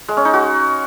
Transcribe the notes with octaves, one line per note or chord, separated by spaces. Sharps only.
G#3
C#4
D#4
F#4